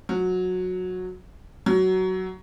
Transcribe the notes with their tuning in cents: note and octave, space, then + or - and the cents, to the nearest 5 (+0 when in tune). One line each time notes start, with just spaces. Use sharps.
F#3 -15
F#3 +15